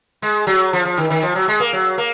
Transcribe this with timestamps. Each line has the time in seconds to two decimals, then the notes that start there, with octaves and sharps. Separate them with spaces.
0.22 G#3
0.47 F#3
0.73 F3
0.85 F3
0.97 D#3
1.10 D#3
1.23 F3
1.35 F#3
1.48 G#3
1.60 A#3
1.73 F#3
1.98 A#3